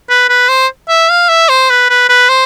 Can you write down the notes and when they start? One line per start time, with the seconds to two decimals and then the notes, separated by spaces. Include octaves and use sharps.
0.09 B4
0.29 B4
0.49 C5
0.89 E5
1.10 F5
1.29 E5
1.49 C5
1.70 B4
1.90 B4
2.09 B4
2.29 C5